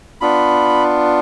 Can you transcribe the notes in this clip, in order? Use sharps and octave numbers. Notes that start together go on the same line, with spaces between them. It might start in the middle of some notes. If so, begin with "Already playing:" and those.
B3 D4 F4 B5